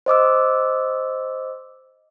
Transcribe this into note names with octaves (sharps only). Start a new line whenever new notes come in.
C5 D#5 D6 E6